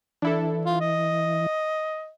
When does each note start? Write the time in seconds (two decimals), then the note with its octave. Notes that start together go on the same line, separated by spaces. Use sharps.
0.22 E3 D4 E4 A4
0.66 F4
0.81 D#5